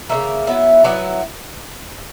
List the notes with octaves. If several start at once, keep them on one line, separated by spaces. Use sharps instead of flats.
C#3 F#3 A#3 E5
F#3 B3 E4 E5
F#3 B3 E4 D5